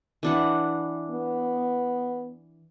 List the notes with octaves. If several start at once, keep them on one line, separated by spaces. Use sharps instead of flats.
E3 D4 F#5
B3